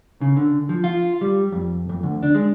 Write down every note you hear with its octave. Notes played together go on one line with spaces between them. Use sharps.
C#3
D3
F3
F4
G3
F2
F2
D2
D4
G#3